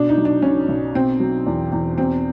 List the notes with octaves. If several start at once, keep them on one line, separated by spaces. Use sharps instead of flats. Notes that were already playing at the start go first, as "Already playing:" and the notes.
Already playing: B2 D4
D#4
F#3
D4
B1 C#4
B1
B2 C4
F#3
E2
E2
B2 C4